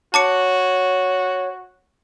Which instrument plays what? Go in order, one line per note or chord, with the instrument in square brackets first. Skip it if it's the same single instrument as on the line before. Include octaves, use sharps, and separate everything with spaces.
[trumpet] F#4 [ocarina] C#5 [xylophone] A5 D6 C#7